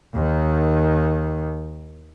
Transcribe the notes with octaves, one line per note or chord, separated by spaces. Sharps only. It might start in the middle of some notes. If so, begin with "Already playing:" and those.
D#2 D#3